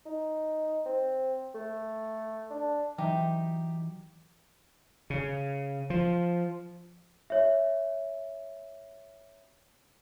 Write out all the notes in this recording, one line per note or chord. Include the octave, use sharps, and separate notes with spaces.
D#4
C4
A3
D4
E3 F#3 D#4 G4 E5
C#3
F3
C#5 E5